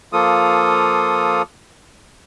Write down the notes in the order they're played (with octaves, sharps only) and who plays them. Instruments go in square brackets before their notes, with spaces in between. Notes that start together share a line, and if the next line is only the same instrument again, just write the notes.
[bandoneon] F3 A#3 F4 A4 D#6